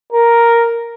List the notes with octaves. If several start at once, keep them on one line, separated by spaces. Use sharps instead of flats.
A#4